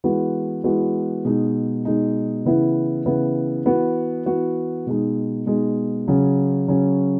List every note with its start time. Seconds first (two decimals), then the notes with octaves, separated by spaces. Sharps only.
0.04 E3 G#3 B3 F#4
0.64 E3 G#3 B3 F#4
1.25 B2 G#3 D#4
1.85 B2 G#3 D#4
2.45 C#3 E3 B3 E4
3.05 C#3 E3 B3 E4
3.65 E3 B3 F#4
4.26 E3 B3 F#4
4.87 B2 G#3 D#4
5.46 B2 G#3 D#4
6.08 C#3 F#3 C#4
6.68 C#3 F#3 C#4